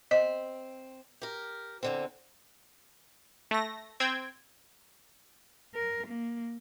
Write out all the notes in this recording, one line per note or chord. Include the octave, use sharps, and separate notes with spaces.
C4 D#5
G4 A#4
E2 D3 C4
A3 A#6
C4 G5 G#6
A#4
A#3